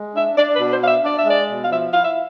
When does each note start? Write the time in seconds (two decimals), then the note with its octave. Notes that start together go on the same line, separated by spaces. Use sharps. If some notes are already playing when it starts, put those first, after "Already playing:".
Already playing: G#3
0.15 D4 E5
0.37 D4 D5
0.54 B4
0.59 B2
0.70 C5
0.82 D4 F5
0.87 E5
1.03 D4 D5
1.17 E5
1.26 G#3 D5
1.49 B2
1.62 F5
1.71 F3 E5
1.93 E4 F5
2.04 E5